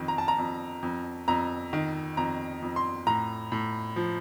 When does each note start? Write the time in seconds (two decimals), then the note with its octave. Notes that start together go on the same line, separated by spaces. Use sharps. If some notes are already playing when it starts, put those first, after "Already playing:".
Already playing: F2 D#3
0.08 A#5
0.18 A5
0.28 A#5
0.38 F2
0.83 F2
1.28 F2 A#5
1.73 D#3
2.17 F2 A#5
2.62 F2
2.76 C6
3.07 A2 A#5
3.52 A2
3.96 F3